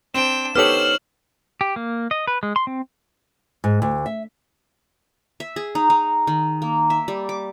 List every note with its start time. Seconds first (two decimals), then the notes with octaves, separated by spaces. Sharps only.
0.14 C4 D4 G5 E7
0.55 B3 D#4 G4 A4 C5 C#5 F6 F#7
1.61 G4
1.76 A#3
2.11 D#5
2.27 B4
2.43 G#3
2.56 C6
2.67 C4
3.64 G#2
3.82 D2
4.06 E5
5.40 E5
5.56 G#4
5.75 D#4
5.90 D#4
6.27 D#3
6.62 A#3
6.90 E5
7.08 G3
7.29 D6